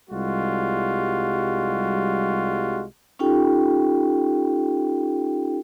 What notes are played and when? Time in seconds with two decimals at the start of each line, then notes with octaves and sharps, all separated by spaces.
0.10 C2 G3 G#3 F4 F#4
3.19 C#4 D#4 F4 G4 A4 G5